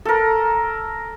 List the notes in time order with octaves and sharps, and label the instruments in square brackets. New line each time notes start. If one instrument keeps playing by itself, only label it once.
[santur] A4 A#4